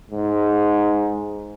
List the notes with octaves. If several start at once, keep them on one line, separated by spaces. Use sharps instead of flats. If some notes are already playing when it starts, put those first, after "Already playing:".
G#2